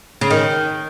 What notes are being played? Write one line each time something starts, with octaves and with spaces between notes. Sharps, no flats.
C#3
D#3